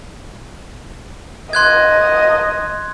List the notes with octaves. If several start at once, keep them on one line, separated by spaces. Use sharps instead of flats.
D#5 C6 F#6 G#6